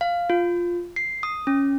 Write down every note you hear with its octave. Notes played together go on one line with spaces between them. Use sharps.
F5
F4
C7
D#6
C#4